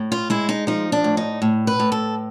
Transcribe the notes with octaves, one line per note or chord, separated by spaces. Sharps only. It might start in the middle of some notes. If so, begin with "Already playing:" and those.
Already playing: A2
F4
G#3 E4
D#4
F3 D#4
D4
A2
D#4
A2
B4
A2
A4